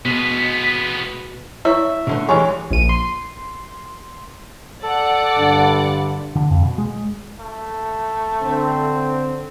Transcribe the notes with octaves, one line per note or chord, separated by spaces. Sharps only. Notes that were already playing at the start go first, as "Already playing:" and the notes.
B2 G#3 B3 B6
E4 C#5 E5 C#6
B2 D3 A3
E3 G3 G#3 C#5 G#5
A#1 D#7
C6
A4 D5 F#5
G2 D3
D3
F2
B2
G#3
A3
D3 C4